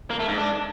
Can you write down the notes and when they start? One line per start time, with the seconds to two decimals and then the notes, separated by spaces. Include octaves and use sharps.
0.10 A#3
0.19 A3
0.28 G#2
0.37 D4